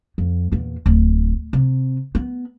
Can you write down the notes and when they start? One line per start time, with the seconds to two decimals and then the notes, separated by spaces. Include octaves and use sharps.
0.18 F2
0.52 E2 A#2
0.86 D1
1.53 C3
2.15 B3